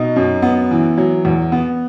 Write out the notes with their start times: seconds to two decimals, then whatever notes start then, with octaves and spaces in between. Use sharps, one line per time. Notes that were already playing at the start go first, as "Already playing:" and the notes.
Already playing: B2 D#4
0.16 F#2
0.42 B3
0.71 E3
0.98 F#3
1.25 E2
1.52 B3